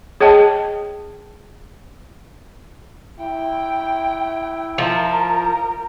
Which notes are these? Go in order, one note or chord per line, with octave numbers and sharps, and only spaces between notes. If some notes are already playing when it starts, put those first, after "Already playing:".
G#4 C#5 D#5 G5 A5
E4 G5
F3 A#4